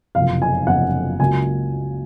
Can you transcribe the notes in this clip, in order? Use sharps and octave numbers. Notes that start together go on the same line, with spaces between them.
F#1 F2 C3 F5
G#5
F#1 F2 C3 F#5
C#2 C#3 F#3 A#3 G#5